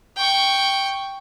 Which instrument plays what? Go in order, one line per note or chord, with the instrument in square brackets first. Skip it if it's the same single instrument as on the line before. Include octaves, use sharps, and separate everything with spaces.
[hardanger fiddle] G5 C#6